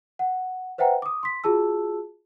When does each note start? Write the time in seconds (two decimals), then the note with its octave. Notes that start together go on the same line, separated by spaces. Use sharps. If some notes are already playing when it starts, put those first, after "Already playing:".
0.19 F#5
0.78 B4 C5 E5 F#5 G5 A#5
1.02 D6 D#6
1.23 C6 B6
1.44 F4 F#4 G#4 A5 E6